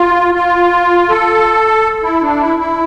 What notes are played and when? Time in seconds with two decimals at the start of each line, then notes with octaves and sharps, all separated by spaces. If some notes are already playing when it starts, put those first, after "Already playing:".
Already playing: F4
0.35 F4
1.10 A4
2.03 E4
2.22 D4
2.40 E4
2.59 E4